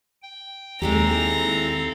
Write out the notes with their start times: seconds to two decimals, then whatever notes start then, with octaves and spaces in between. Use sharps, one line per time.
0.22 G5
0.82 D#2 G#3 C4 E4 G4 A4 F5 A#5